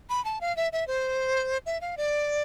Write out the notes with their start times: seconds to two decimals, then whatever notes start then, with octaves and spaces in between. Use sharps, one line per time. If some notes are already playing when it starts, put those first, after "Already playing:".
0.09 B5
0.25 A5
0.41 F5
0.57 E5
0.73 E5
0.88 C5
1.66 E5
1.81 F5
1.97 D5